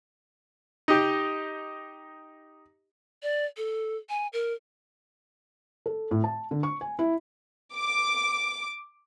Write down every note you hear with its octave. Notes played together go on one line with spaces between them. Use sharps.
D#4 G4
D5
A4
G#5
A#4
A4
A2
A5
D3
C#6
G#5
E4
D6